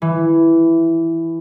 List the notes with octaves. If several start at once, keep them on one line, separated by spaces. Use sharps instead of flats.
E3